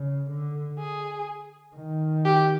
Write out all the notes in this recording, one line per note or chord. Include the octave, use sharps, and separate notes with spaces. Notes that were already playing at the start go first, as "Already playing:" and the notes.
Already playing: C#3
D3
G#4
D#3
G4